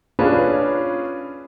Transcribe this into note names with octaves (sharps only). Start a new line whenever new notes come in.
C#4 D4 F4 G#4 B4 C#5